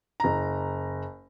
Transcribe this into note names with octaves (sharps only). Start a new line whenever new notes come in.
F#1 A#5